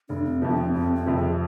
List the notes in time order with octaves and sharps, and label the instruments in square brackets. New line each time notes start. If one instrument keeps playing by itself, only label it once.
[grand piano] F1 [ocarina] D4
[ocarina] C4
[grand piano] F2 C3 F3 [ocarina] B3
[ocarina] D4
C4
[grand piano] F1 [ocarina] C4
[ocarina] C4
[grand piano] F2 C3 F3
[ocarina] G#4